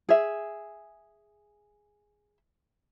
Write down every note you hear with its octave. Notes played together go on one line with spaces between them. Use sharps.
G#4 E5